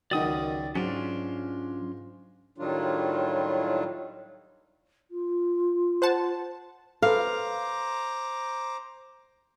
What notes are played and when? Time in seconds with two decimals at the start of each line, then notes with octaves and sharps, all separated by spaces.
0.11 C#2 F#2 D#3 D#4 F#4 D5 D#6
0.75 G#2 F#3 C#4 D4 F4
2.58 A2 D#3 F#3 G3 D4 F4
5.11 F4
6.02 C5 F#5 A5
7.02 A4 B4 C5 F5 A#5 D6